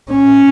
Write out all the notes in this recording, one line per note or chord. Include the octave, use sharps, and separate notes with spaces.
C#4